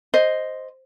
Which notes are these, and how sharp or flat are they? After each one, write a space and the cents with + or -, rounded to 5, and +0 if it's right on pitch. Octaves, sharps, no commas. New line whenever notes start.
C5 +0 D#5 +0